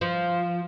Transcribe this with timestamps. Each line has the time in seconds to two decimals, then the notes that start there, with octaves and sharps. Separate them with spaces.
0.01 F3